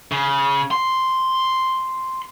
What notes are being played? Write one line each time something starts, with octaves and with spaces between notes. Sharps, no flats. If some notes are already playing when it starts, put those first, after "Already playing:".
C#3
C6